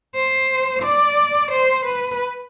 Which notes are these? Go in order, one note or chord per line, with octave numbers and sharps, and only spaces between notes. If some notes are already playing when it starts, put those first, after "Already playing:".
C5
D5
C5
B4